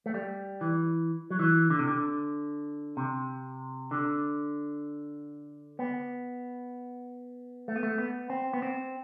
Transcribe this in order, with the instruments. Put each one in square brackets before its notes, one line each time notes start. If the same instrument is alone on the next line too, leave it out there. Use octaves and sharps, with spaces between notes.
[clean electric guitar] A3
G3
E3
F#3
E3
D3
C3
D3
C3
D3
B3
A3
B3
A3
B3
C4
B3
C4